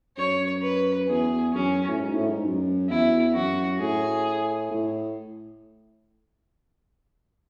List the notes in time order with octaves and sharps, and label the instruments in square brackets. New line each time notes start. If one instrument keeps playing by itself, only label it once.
[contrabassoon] F#2 [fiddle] C#5
[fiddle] B4
[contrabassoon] E2 [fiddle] G#4
[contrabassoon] F#2 [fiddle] C#4
[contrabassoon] A2
G#2
A2
G#2
F#2
[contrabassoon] E2 [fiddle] E4
[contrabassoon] F#2 [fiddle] F#4
[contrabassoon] A2 [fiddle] G#4
[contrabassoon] A2